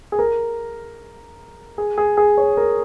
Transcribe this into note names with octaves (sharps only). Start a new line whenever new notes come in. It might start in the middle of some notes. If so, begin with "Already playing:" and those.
G#4
A#4
G#4
G#4
G#4
C#5
A#4